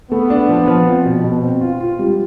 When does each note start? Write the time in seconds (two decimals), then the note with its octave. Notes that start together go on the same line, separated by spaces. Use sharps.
0.11 A3 B3
0.30 D4
0.49 F3
0.68 F3
0.87 C4
1.05 B2
1.24 B2
1.43 C4
1.61 F4
1.80 F4
1.99 G3